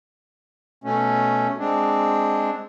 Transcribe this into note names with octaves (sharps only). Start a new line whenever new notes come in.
B2 A3 C#4
G#3 C4 D4